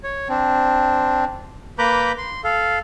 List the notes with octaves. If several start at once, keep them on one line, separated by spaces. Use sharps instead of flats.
C#5
C4 D4
A#3 B4 A#5 B5 D6 G6
C6
A4 F5